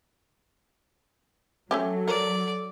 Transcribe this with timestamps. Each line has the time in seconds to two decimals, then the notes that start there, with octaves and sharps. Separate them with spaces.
1.71 F#3 A3 C#4 G4 A4
2.08 A#4 D5